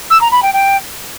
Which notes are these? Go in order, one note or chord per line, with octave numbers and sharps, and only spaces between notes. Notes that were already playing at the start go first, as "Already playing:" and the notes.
E6
A#5
B5
G5
G5